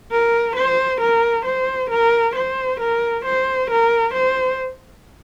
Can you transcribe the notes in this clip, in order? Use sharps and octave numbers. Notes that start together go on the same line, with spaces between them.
A#4
C5
A#4
C5
A#4
C5
A#4
C5
A#4
C5